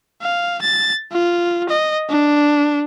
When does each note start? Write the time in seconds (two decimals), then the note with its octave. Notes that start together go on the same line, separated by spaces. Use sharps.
0.22 F5
0.62 A6
1.11 F4
1.69 D#5
2.09 D4